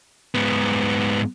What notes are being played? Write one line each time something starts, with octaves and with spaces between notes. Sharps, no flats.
G#2 B3